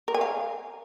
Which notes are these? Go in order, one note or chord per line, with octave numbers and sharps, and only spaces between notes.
A#4
G#5
F5